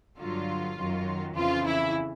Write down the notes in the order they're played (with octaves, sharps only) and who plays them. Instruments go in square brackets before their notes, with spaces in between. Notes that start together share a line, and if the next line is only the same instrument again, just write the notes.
[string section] G2 D3 F#3 F4
F#2 D#3 F#3
F2 C#3 E3 F4
E4